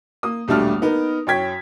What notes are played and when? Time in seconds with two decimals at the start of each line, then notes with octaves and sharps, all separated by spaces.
0.23 A#3 D#6
0.48 D#1 B1 G3 A3 D4 F6
0.82 B3 D#4 A#4
1.27 F#2 C#5 G5 G#6 B6